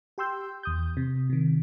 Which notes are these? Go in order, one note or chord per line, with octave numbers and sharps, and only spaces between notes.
G4 G5 C6 E6 G6
E2 D#6 G6
C3
C3 D#3